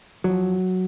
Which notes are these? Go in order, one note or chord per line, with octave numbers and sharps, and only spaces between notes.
F2 F3 F#3